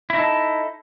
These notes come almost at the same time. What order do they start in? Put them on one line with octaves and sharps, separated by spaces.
E4 D#4 A4